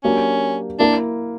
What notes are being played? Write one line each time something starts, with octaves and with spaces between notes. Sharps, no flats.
F#3 A#3 C#4 D4 G4 A#4
A#3 D4 E4